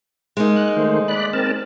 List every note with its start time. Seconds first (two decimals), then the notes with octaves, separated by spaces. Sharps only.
0.37 G#3 A#3 D#4
0.56 F#6
0.77 D#3 A3 C5
1.08 D5 B5 F#6
1.33 C4 A#4 A5